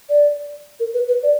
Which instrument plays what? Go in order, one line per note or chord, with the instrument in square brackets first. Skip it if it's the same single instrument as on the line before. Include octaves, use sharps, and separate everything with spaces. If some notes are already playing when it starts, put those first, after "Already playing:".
[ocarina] D5
A#4
B4
B4
D5